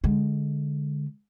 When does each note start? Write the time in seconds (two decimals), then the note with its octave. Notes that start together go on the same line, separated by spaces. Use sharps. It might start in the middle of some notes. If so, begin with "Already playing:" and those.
0.04 D3 G#3